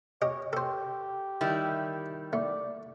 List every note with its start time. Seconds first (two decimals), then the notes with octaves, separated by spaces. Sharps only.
0.22 G4 C#5 D#5
0.53 G4 A4 C5
1.41 D#3 G3 E4
2.33 A3 D5